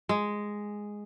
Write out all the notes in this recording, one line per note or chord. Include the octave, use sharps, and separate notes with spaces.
G#3